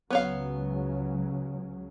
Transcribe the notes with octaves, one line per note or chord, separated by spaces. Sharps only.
C#2 C#3 F#3 B3 C#5 F5